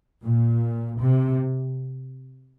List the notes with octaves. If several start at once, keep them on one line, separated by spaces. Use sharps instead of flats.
A#2
C3